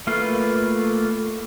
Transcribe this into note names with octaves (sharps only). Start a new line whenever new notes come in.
A3 A#3 F4 B4 F5